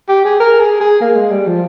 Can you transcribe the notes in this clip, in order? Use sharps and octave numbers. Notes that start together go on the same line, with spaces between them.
G4
G#4
A#4
G#4
G#4
A#3
G#3
G3
F3